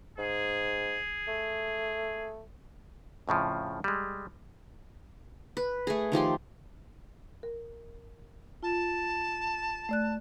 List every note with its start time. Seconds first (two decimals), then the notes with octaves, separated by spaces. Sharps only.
0.18 G#2 G#4
1.28 A3
3.28 F2 A2 C#3 F3
3.84 G3 G#3
5.57 B4
5.87 A3 G#4
6.12 D#3 F3 G4 C6
7.43 A#4
8.63 F4 A5
9.89 A3 D5 F#6